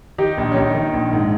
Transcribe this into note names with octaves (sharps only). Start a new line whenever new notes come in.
D#3 D#4 G4
A#1
C#4
D#3 D#4
D#3
A#1
G#2